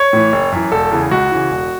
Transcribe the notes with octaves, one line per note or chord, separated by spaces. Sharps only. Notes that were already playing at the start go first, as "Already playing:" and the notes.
Already playing: C#5
A2 E3
F#1
F#2 E3
E1 A4
E2 C#3 E3
C#2 F#4
C#3 E3
E1